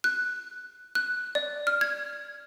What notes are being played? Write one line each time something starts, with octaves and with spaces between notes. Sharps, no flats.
F#6
F#6
D5
F6
G#6